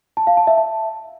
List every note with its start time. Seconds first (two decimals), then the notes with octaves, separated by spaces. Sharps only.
0.17 A5
0.27 F5
0.37 A5
0.47 E5
0.57 A5